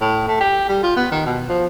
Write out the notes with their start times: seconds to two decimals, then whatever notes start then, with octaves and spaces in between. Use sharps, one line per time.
0.01 A2
0.28 A3
0.40 G4
0.69 G3
0.83 F4
0.96 B3
1.12 D#3
1.26 B2
1.49 F3